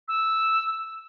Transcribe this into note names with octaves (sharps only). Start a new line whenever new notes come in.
E6